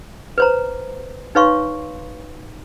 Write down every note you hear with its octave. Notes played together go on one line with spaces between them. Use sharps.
B4 C5 A#5
D#4 B4 C#5 F5 C6 C#6